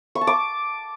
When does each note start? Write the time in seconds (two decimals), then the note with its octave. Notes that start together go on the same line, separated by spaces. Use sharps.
0.15 C#6
0.21 A5
0.27 D6